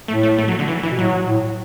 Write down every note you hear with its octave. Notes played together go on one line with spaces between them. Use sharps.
A2 A3
A3
A3
F#3
D3
E3
E3
B2
A2 F#3
A2